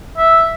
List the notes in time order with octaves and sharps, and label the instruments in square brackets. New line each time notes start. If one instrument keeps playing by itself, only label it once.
[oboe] E5